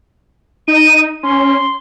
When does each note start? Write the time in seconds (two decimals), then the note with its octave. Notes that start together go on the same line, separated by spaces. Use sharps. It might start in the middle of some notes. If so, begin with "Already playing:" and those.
0.68 D#4 D#7
1.23 C#4 C6